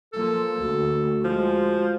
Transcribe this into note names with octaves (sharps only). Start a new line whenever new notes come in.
F3 A#3 A4
D2 F#4
F3 G#3